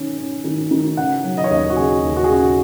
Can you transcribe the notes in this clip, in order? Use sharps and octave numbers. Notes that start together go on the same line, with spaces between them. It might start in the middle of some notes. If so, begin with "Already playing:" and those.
Already playing: D#3 C#4
C#4
D#3
D#3
C#3 F#5
F#3
D#5
C#5
D#2 D#5
F#4
C#3 G#4
D#2
F#4
G#4
C#3 F#4